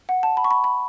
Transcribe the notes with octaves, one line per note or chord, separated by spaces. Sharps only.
F#5
A5
B5
C#6
B5
B5